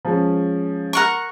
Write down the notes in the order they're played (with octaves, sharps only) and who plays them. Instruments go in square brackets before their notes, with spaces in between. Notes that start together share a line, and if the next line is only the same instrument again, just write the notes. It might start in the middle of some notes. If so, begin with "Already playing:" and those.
[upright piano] F3 G#3 C#4
[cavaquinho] A#4 F#5 C#6